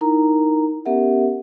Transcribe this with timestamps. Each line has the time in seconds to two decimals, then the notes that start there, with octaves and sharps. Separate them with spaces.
0.01 D#4 E4 A#4 A#5
0.85 B3 C#4 G4 A#4 E5 F#5